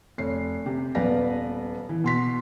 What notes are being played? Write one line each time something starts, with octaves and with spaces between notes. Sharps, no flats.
F1 C#5 C7
C3 G4
D#1 B3 B4 D5 F5 A#6
E3
B2 C6 B6